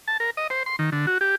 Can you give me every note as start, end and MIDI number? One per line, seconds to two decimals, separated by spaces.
0.08 0.17 81
0.20 0.30 70
0.37 0.47 75
0.50 0.63 72
0.66 0.76 84
0.79 0.90 51
0.92 1.06 50
1.07 1.18 66
1.21 1.35 67